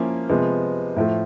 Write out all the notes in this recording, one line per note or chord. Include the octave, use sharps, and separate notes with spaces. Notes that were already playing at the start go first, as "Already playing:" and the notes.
Already playing: F3 A#3 C#4 E4
C3 F3 G#3 B3
A2 F3 A3